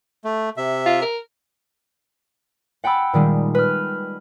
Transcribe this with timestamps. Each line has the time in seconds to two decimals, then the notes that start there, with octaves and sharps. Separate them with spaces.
0.24 A3
0.57 C3 E5
0.86 F4
1.02 A#4
2.84 F#5 G5 A5 B5 E6
3.13 A#2 D#3 G3 G#3
3.55 B4 F6